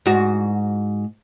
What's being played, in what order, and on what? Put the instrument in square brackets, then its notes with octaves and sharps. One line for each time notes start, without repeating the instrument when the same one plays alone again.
[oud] G#2 F#4